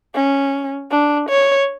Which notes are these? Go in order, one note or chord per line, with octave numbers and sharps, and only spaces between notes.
C#4
D4
C#5